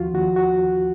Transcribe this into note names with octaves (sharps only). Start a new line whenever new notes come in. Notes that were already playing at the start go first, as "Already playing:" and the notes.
Already playing: D#2 F3 F4 F#4
D#2 F#4
F#4